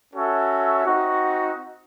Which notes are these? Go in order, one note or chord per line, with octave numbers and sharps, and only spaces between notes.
C#4 F#4 A4 C#5 E5
C4 D#4 F#4